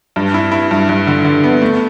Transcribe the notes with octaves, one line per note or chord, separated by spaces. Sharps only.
G2
E4
E4
G2
G2
D3
D3
B3
A3